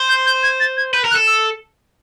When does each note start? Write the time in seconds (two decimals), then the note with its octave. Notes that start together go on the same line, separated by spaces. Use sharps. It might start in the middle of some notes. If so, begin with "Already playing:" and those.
Already playing: C5
0.09 G6
0.26 G6
0.43 G#6
0.60 A6
0.77 G#6
0.94 B4 G6
1.05 A#4
1.11 F#6
1.16 A4
1.27 E6